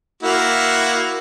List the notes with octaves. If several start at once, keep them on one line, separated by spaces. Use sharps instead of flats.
A#3 E4 F#4